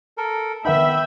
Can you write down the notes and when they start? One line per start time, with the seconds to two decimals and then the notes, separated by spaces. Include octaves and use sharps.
0.18 A4 A#4
0.65 D#3 B3 D#4 E5 G5 B5